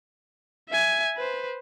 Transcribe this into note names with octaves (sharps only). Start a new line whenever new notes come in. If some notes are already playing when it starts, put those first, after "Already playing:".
E5 G#5
B4 C5